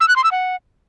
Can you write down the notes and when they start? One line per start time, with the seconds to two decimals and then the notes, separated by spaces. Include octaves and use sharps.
0.01 E6
0.08 F#6
0.16 C6
0.24 E6
0.32 F#5